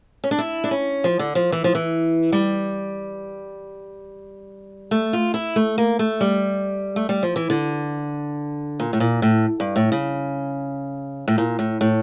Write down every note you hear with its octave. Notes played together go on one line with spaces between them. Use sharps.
C#4
D4
E4
D4
C#4
F3
D3
F3
E3
F3
E3
G3
A3
F4
E4
A3
A#3
A3
G3
A3
G3
F3
E3
D3
A#2
A2
A#2
A2
G2
A2
C#3
A2
A#2
A2
A2